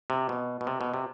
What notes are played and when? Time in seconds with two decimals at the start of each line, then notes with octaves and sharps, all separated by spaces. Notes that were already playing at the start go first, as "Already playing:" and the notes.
0.10 C3
0.29 B2
0.61 B2
0.67 C3
0.81 B2
0.94 C3